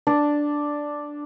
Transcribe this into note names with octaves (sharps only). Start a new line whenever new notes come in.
D4